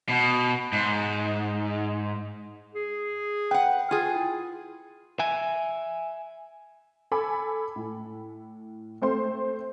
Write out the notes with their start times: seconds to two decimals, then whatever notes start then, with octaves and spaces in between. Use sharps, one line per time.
0.09 B2
0.73 G#2
2.75 G#4
3.51 B4 F#5 G5
3.91 F4 G#4 G#5
4.15 E4
5.19 E5 G#5
7.12 A4 G#5 B5 D6
7.76 A2
9.02 A3 C4 C5 C6